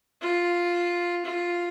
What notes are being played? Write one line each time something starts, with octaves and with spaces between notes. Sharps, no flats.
F4
F4